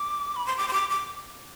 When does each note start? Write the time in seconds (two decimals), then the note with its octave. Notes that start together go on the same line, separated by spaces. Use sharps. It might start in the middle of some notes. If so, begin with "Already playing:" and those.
Already playing: D6
0.36 B5
0.46 C6
0.57 D6
0.68 C6
0.73 D6
0.90 D6